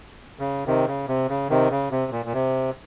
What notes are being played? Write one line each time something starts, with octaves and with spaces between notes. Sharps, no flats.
C#3
C3 D#3
C#3
C3
C#3
C3 D#3
C#3
C3
A#2
A#2
C3